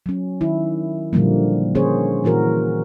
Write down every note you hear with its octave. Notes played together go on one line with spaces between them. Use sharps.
F#3 C#4
D#3 E4
A#2 D3 F3 G3 A#3
D3 A#3 C#4 G#4 C5 C#5
A#2 E3 F#4 A#4